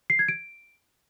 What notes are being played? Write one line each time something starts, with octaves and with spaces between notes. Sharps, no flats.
C7
G#6
D7